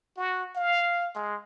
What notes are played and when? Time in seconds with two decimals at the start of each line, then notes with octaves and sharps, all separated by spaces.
0.17 F#4
0.56 F5
1.15 G#3